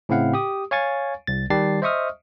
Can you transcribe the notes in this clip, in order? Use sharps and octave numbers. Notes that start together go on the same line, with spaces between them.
A2 C#3 C4 E4 F5 F#5
G4 D#6
C#5 F5 G#5 C#6 A6
C2 A6
D#3 G3 G4 A5 A6 C7
C5 D#5 E5 C#6 D#6 F6